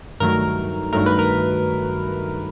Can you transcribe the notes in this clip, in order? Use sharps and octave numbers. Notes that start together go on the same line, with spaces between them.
G2 D#3 F#3 A3 A#4
G2 D#3 F#3 A3 A#4
B4
A#4